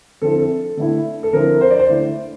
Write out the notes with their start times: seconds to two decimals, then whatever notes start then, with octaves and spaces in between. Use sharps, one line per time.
0.22 D3 F3 C4 E4 A4
0.38 A4
0.77 D3 A3 E4
1.23 A4
1.33 D3 F3 C4 E4 A#4
1.61 C5
1.71 D5
1.79 C5
1.89 D3 A3 E4